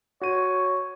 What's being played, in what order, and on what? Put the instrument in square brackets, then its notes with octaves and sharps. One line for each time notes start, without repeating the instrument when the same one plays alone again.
[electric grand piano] F#4 D#7 [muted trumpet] C#5